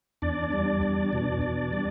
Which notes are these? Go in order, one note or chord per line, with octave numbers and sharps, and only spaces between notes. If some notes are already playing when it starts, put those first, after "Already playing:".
E2 D4 D5
G3
E2
B2
E2
G3